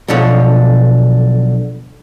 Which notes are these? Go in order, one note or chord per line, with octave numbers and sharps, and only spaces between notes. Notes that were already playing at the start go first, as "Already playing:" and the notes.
B1 B2 D3 F3 C#5